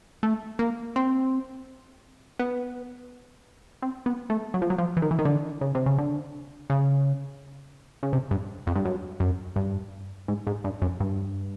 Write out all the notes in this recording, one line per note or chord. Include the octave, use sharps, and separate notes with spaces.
A3
A#3
C4
B3
C4
B3
A3
F#3
F3
F#3
F3
E3
D#3
E3
D#3
D3
C#3
C3
C#3
D3
C#3
C#3
C3
G2
F2
G2
F#2
F#2
G2
G#2
G#2
G2
F#2
G2